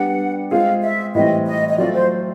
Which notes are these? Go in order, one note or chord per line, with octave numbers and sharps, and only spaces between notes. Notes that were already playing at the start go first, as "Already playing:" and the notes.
Already playing: G3 B3 D4 F#5
G#3 C4 F4 G#4 F5
E5
A2 E3 G3 C4 D#5
D#5
D#5
F#3 A3 C4 F4 D5
C5